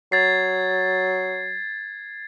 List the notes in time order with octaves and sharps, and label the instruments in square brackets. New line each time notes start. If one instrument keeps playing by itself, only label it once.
[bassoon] F#3 [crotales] G#6 A6 C7